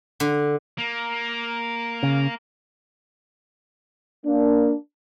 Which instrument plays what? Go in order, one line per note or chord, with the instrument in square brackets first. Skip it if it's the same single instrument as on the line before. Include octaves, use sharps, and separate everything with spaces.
[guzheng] D3
[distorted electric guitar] A#3
[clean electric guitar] C#3
[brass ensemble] A#3 D4